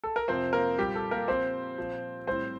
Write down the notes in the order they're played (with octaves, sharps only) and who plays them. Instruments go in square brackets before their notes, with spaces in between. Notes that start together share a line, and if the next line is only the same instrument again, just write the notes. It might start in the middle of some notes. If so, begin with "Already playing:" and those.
[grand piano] A4
A#4
F2 C3 F3 C4 C5
A#3 A#4
A#2 G3 G4
A4
A#3 A#4
A#2 F3 C4 C5
A#2 F3
A2 G3 C4 C5